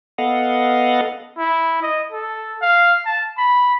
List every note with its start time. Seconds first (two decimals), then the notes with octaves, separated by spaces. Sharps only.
0.18 B3 A4 D#5 F5 F#5
1.38 E4
1.82 D#5
2.12 A4
2.61 F5
3.06 A5
3.38 B5